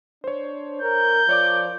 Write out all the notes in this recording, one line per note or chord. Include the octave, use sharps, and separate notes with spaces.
D4 C5 C#5
A#4 G6
F3 C#5 D5 D6